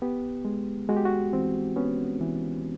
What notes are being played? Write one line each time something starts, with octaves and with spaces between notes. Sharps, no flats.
B3 G4
G#3
G#3 F#4
G4
F#4
E3 C4
B3 C#4
E3